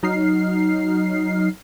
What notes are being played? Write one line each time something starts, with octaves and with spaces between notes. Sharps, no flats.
F#3 D#4 F6 C7